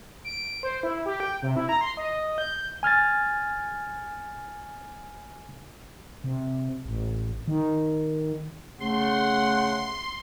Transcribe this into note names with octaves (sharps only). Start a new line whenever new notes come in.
D7
C5
E4
G4
G5
C3
E4
A#5
C6
D#5
G6
G#5 F6 G#6 A6
C3
A1
D#3
C#3 A3 F#5 C6